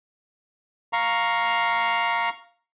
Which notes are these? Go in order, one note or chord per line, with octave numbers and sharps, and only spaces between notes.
F5 A#5 C#6